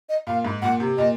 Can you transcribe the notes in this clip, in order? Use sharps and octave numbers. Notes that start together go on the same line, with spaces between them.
D#5
A#2 F5
G#2
A#2 F#5
C3
A#2 D#5